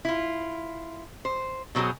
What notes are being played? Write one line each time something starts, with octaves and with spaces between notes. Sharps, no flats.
E4 F4
C5
B2 F#3 A#3 C4 G#4